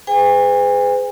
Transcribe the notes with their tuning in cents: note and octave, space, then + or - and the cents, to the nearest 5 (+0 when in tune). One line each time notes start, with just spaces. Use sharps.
G#4 +0 B4 +45 G#5 -40